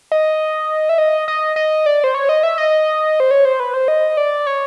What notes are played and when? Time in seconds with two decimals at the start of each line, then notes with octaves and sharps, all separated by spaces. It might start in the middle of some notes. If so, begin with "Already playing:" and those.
0.12 D#5
0.89 E5
0.98 D#5
1.28 D#5
1.56 D#5
1.86 D5
2.04 C5
2.15 C#5
2.29 D#5
2.43 E5
2.58 D#5
3.20 C5
3.31 C#5
3.45 C5
3.60 B4
3.74 C5
3.88 D#5
4.17 D5
4.46 C#5